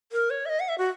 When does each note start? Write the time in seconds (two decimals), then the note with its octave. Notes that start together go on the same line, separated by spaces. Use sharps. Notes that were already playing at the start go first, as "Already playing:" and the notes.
0.12 A#4
0.30 C#5
0.46 E5
0.49 D#5
0.60 F#5
0.69 E5
0.78 F#4